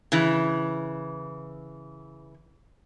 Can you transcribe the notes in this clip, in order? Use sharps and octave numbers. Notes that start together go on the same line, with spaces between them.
C#3 E3